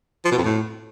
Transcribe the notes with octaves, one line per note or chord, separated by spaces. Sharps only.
F3
B2
F2
A2